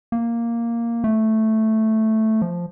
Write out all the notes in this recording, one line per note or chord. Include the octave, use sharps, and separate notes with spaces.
A#3
A3
F3